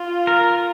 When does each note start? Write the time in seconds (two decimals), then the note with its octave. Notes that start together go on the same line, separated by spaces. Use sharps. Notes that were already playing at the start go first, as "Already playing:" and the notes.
Already playing: F4
0.27 A#4